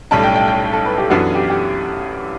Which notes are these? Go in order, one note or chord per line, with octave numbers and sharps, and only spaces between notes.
B1 A2 G3 C#4 A5
G5
G5
G5
A4
B4
G4
F#2 E3 B3 D4 F#4 A4
G4
G4